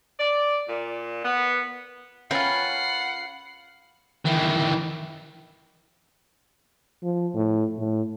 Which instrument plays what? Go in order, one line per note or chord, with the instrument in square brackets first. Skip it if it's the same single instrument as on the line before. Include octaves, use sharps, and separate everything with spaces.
[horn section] D5
A#2
B3
[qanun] C#4 A#4 G5 [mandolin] F4 B4 [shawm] F#5 [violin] C7
[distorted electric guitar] D#3 E3
[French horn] F3
A2
A2